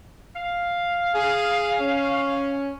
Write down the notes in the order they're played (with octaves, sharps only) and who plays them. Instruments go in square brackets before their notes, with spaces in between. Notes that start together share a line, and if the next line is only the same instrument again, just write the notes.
[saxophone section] F5
[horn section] G#4
C#4